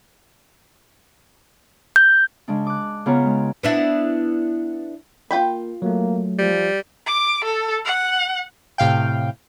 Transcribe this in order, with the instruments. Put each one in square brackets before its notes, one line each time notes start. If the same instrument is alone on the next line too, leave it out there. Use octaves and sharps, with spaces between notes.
[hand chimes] G6
[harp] C#3 G#3 D4
D6 F#6
C#3 B3 F4 C#5 A#5
G#3
[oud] B3 D4 E4
[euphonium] A#3 [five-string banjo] F4 G5 B5
[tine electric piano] F#3 A3 [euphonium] A#3
[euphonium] F3 [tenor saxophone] G3
[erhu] D6
A4
F#5
[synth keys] A2 C3 F5 G5